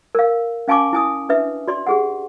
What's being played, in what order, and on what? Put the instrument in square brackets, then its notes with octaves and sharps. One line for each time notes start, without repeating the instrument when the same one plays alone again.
[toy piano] A#4 F5
C#4 F5 G#5 A5 C#6 D6
E4 G#5 D#6
D4 B4 E5
F#4 D5 C6
G4 G#4 F#5